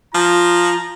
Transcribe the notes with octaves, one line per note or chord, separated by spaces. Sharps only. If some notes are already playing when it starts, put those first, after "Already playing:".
F3 F4 A#5